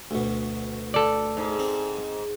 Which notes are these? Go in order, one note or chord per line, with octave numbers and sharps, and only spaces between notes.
D2 B2
A4 D5
G#2
C4